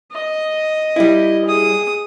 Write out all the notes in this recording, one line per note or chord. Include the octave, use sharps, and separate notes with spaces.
D#5
G3 E4
G#4 D#6